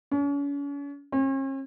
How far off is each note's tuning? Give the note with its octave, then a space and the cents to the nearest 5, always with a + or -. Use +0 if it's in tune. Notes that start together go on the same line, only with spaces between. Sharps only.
C#4 +40
C#4 -45